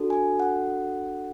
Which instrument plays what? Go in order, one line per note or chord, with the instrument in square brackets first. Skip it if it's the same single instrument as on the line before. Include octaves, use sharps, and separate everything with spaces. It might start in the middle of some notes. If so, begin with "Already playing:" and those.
Already playing: [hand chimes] D4 F#4 A4
G#5
F#5